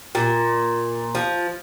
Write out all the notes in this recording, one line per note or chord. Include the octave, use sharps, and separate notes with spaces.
A#2
F3